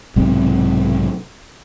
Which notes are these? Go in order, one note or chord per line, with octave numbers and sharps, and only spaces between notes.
B1 G#2 C3